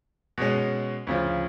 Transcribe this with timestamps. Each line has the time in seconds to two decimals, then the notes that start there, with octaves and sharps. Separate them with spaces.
0.38 B2 G#3 C#4
1.07 D2 C#3 F3